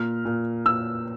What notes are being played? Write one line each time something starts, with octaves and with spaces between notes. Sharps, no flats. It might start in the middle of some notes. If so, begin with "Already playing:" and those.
Already playing: A#2 F6
A#2
A#2 E6